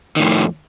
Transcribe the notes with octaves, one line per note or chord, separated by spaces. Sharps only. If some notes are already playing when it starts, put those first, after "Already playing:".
F2 A2 D#3